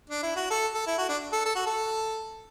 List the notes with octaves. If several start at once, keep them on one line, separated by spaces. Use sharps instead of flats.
D4
E4
F#4
A4
A4
E4
F#4
D4
A4
A4
F#4
A4